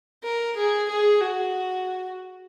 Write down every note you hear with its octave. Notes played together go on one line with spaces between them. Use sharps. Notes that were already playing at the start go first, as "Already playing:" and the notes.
A#4
G#4
G#4
F#4